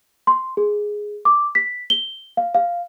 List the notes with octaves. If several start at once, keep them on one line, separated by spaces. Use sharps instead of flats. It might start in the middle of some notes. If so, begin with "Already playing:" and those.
C6
G#4
D6
B6
G7
F5
F5